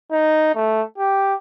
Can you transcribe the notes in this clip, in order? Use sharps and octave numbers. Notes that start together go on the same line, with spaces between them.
D#4
A3
G4